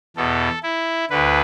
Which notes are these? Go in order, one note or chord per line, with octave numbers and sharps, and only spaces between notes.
E2 B2 A4
E4
D2 D3 B4